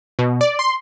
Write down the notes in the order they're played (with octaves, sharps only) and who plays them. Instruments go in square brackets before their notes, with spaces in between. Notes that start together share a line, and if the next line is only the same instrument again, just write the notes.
[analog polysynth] B2
D5
C6